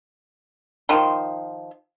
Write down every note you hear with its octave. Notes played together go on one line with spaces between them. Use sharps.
D#3 F3 C6